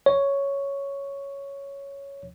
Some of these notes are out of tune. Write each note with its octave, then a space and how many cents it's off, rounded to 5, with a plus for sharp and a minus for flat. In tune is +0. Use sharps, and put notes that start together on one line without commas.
C#5 +5